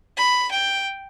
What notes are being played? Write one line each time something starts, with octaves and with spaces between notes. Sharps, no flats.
B5
G5